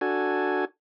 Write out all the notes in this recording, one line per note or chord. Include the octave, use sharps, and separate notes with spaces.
D4 F#4 A4 G#5